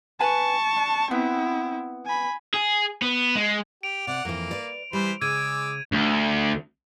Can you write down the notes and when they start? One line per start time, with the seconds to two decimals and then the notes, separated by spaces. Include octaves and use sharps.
0.20 B4 G#5 A5 B5 C#6
0.77 D4
1.11 B3 C4 E4
2.06 G#5 B5
2.54 G#4
3.02 B3
3.36 G#3
3.83 G4 D7 F7
4.07 C3 D5 F#5
4.25 F2 E3 A#3
4.51 B4 D5
4.93 E3 G3 C5 B5
5.21 C#3 G#3 D6 E6 G#6 D#7
5.92 D2